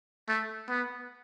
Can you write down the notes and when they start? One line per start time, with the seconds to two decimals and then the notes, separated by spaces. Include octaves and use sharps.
0.29 A3
0.70 B3